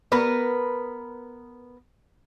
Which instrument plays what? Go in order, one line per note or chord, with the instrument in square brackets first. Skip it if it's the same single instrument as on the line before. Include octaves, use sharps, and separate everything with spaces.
[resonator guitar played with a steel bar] B3 A#4 B4